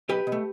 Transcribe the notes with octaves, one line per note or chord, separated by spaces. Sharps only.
B1 G4 B4
B2
A3